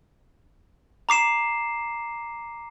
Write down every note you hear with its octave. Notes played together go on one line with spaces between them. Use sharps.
A#5 D6 C7 E7